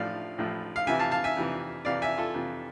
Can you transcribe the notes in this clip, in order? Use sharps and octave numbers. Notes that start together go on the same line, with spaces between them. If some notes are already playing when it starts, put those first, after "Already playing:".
Already playing: A1 A2 F3 D5 F5
A1 A2 F3
F5
F2 C3 E3 E5 G#5
F5 A5
F5 A5
E5 G#5
F2 C3 E3
F2 C3 E3 D5 F5
E5 G#5
F4 A4
F2 C3 E3